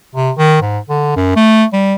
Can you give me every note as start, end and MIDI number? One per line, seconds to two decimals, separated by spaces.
0.15 0.31 48
0.38 0.59 51
0.62 0.79 44
0.90 1.12 50
1.16 1.34 42
1.36 1.64 57
1.73 1.96 55